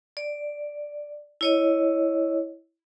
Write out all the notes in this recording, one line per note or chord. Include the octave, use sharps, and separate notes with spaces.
D5
E4 C#5 D#5